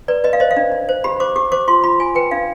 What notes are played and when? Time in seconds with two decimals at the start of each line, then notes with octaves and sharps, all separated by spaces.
0.08 B4 D5
0.24 B4 D#5
0.33 F5
0.40 C5 D#5
0.51 F5
0.56 D4
0.72 D4
0.89 C5
1.04 G4 B5
1.20 C5 D6
1.36 G4 D6
1.52 C5 D6
1.68 F4 C6
1.84 F4 B5
2.00 F4 G#5
2.15 B4 G5
2.31 D4 F5